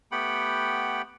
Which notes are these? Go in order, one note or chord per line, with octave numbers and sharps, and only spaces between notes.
A3 B3 G4 F#5 G5 B5